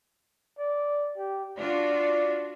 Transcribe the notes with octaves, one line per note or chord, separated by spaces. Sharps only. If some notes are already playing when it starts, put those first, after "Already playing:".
D5
G4
D4 F4 F#4 D5